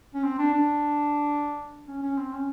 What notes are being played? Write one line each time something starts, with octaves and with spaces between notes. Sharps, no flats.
C#4
C4
D4
D4
C#4
C#4
C4
C#4